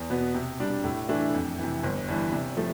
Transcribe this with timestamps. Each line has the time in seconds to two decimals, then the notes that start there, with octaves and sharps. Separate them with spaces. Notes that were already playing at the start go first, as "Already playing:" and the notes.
Already playing: E2
0.10 B2 B3
0.34 C3
0.60 G3 D4
0.84 A2
1.09 E3 A3 D4
1.34 F2
1.59 C3 E3
1.83 G1
2.08 G2 E3
2.32 C3
2.57 F3 A3